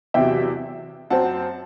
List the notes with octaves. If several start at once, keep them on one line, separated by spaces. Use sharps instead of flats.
E2 C3 F#3 E5 G5
F#2 F#3 C4 F#5 A5